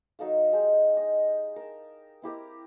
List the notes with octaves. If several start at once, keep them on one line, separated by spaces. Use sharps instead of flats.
F#3 D#4 A4 F5
G#3 D#4 G4
D#5
A#4 A5
C4 E4 G4 A#4